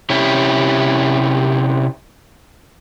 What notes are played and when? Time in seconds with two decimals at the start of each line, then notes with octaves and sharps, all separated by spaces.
0.10 C3 C#4 E4 G4